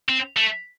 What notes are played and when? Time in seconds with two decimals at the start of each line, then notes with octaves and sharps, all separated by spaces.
0.09 C4
0.37 A3